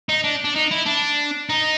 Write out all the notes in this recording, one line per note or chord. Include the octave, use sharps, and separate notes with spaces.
D#4
D4
D4
D#4
E4
D4
D#4